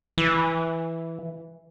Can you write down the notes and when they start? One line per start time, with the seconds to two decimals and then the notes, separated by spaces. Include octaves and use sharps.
0.18 E3